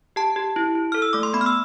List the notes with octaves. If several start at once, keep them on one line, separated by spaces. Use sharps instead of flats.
G4 A5
G4
E4
E4
A4 F6
E6
A3 D6
C6
B3 B5
F6
E6